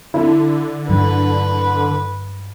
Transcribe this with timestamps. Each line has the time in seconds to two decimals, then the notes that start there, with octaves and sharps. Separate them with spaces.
0.14 D3 E4
0.89 G2 F#3 D4 B4